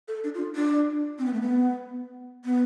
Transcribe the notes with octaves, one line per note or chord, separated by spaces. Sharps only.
A4
D4
F4
D4
C4
B3
A3
B3
B3